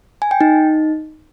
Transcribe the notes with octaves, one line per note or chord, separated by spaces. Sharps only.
G#5
G5
D#4